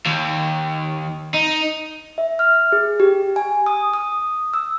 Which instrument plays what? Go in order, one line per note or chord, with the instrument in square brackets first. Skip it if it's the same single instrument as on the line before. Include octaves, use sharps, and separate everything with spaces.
[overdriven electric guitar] D#2
D#4
[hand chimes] E5
F6
G#4
G4
G#5
D#6
D#6
E6